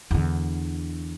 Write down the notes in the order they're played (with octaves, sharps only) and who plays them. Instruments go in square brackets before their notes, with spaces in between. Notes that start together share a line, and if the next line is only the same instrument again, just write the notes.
[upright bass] E2 D3